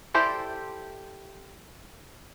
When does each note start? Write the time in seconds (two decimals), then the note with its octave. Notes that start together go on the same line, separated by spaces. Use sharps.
0.14 E4 G4 A4 C5 D5